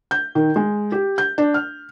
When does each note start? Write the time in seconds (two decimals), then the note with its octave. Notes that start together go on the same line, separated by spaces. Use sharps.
0.11 G6
0.35 D#3
0.56 G#3
0.92 G4
1.18 G6
1.38 D4
1.54 F6